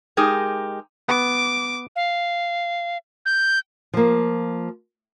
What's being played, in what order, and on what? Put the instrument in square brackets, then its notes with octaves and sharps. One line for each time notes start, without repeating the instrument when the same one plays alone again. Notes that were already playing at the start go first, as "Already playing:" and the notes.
[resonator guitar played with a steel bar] G#3 D#4 G4 G#4 A#4
[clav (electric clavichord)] B3 [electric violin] D6
[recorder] F5
G6
[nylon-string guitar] F3 A#3